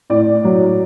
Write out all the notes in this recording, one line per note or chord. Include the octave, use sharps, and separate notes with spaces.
A2 D5
F#3